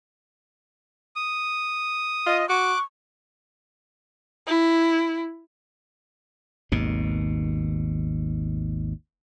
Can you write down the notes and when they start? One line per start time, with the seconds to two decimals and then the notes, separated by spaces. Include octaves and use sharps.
1.16 D#6
2.26 F4 D#5
2.49 F#4 C#6 D6 F#6
4.47 E4
6.72 G#1 D#2 B2